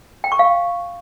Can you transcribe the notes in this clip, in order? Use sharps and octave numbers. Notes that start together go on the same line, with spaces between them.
G5
C#6
F5